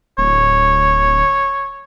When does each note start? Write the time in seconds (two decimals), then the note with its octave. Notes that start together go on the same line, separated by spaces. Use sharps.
0.18 D1 C#5